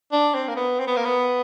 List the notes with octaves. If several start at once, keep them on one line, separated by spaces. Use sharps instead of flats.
D4
C4
A#3
B3
C4
B3
A#3
B3